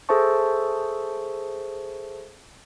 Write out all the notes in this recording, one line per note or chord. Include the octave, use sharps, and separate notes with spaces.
G#4 A4 C5 E5 A5 C#6